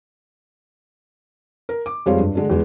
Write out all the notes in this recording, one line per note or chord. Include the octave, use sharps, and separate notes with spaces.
A#4
D6
F2 G3 G#3 C4 F4 C#5
G2
D3 G#3 D4
E2 G#3